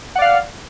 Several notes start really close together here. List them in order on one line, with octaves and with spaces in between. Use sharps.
F#5 D5 F5